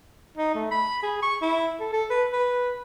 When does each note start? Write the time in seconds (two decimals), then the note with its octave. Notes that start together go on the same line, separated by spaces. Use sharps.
0.38 D#4
0.55 A3
0.71 B5
1.02 G#4
1.22 C#6
1.42 E4
1.80 A4
1.92 A4
2.10 B4
2.32 B4